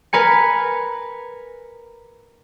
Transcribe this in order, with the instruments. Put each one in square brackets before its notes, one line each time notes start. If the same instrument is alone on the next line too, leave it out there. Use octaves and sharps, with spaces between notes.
[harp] A#4 B4 G#5 C#7